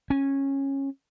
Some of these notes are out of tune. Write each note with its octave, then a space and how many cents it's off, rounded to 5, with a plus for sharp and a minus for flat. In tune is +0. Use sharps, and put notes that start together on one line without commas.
C#4 -15